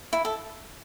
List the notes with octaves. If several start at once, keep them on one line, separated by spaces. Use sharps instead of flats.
E4
A4